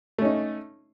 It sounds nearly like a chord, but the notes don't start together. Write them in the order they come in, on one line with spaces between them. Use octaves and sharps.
A3 C#4 D#4